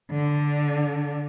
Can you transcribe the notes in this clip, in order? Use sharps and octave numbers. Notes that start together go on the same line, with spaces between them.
D3